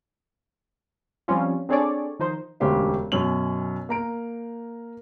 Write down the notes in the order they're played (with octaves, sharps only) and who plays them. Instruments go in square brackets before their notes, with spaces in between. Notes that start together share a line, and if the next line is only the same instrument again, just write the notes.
[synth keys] F3 G3 C4 C#4 F4
C4 D4 G#4 A4 C#5 D5
D#3 F3 D#4 C5
[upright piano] E1 D2 C#4 G4 C5 F5
F#2 B2 C#4 F#7
A#3 A#5 D7